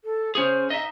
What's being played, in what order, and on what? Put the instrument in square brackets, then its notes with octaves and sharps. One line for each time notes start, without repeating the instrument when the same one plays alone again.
[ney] A4
[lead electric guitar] C#4 G#4 [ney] C5
[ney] D#4 [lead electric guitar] D#5 E5